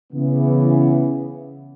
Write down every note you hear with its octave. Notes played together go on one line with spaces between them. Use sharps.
C#3 E3 B3